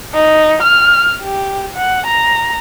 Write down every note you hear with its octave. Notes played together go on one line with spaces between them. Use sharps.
D#4
F6
G4
F#5
A#5